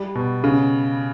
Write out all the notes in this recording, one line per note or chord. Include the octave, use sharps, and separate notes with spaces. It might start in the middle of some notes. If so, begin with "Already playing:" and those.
Already playing: G3
B2
C#3